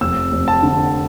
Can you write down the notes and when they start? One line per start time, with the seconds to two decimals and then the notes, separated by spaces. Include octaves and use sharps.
0.01 F1 E6
0.32 F1
0.48 A5
0.63 D3